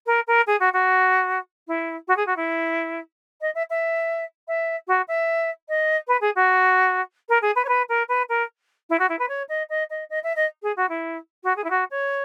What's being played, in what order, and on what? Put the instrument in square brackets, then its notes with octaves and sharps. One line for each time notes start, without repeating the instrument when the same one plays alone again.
[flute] A#4
A#4
G#4
F#4
F#4
E4
F#4
G#4
F#4
E4
D#5
E5
E5
E5
F#4
E5
D#5
B4
G#4
F#4
A#4
G#4
B4
C#5
B4
A#4
B4
A#4
E4
F#4
E4
B4
C#5
D#5
D#5
D#5
D#5
E5
D#5
G#4
F#4
E4
F#4
G#4
E4
F#4
C#5